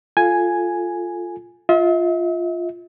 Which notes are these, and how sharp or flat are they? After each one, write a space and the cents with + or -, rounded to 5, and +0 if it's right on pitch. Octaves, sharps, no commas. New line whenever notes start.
F4 +0 A4 +0 G#5 +0
F4 +0 E5 -45